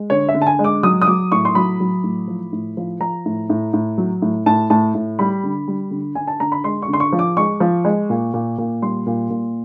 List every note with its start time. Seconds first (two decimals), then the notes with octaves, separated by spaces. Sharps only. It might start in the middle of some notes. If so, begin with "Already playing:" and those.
Already playing: G#3
0.10 D3 C#5
0.29 E5
0.35 D3
0.42 A5
0.47 G#5
0.59 G#3
0.64 D6
0.83 F#3 D#6
1.02 D#6
1.07 F#3 D6
1.32 A2 C#6
1.45 C6
1.55 F#3 B5
1.80 F#3
2.03 A2
2.28 F3
2.52 A2
2.77 F3
3.00 F3 A#5
3.26 A2
3.50 A2
3.73 A2
3.98 F#3
4.22 A2
4.46 A2 A5
4.70 A2 A5
4.94 A2
5.19 G3 B5
5.44 D3
5.68 G3
5.91 D3
6.15 D3 G#5
6.27 A5
6.40 D3 A#5
6.52 B5
6.64 G#3 C6
6.82 C#6
6.88 D3
6.93 C6
7.00 C#6
7.12 F3
7.19 D6
7.37 G#3 C#6
7.60 F3
7.85 G#3
8.10 A#2
8.34 A#2
8.58 A#2
8.82 G3 C6
9.07 A#2
9.30 A#2